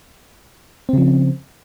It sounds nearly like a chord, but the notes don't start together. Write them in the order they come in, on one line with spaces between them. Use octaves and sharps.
C4 C#3 F3